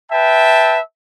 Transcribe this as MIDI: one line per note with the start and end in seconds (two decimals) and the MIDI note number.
0.11 0.79 71
0.11 0.79 76
0.11 0.79 79
0.11 0.79 81